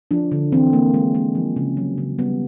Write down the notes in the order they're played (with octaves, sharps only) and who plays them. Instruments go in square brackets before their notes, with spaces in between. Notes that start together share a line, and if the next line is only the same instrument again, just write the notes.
[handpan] F3 D4
D3
E3 C4
A#3
G#3
G#3
F3
C#3
F#3
C#3
G3 B3